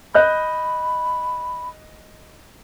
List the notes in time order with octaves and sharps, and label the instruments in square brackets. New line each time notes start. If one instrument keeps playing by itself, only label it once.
[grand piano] D#5 F#6 G6 [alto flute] B5